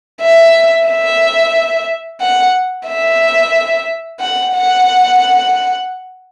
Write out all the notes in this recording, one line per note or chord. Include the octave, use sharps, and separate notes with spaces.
E5
E5
F#5
E5
F#5
F#5